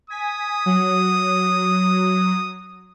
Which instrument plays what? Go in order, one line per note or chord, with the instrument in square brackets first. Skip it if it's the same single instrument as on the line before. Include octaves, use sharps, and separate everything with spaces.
[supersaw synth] G#5 B6 [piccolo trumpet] D#6
[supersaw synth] F#3